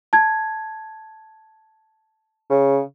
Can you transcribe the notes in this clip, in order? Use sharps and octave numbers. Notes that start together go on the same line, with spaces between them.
A5 G#6
C#3